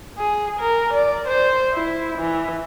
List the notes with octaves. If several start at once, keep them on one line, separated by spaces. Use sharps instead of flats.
G#4
A#4
D5
C5
E4
E3